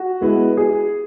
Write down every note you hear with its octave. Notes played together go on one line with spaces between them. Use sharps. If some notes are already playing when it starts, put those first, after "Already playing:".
Already playing: F#4
G#3 B3 E4 B4
G#4